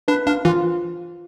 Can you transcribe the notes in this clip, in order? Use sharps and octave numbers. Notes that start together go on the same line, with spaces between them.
D4 B4
D4 F5
E3 F4